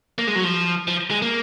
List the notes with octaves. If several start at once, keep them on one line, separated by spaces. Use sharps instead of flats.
A#3
G#3
F#3
F3
F3
G#3
A#3